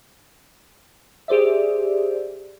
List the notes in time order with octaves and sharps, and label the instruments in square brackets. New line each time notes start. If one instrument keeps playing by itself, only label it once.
[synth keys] G4 G#4 C5 D5 E5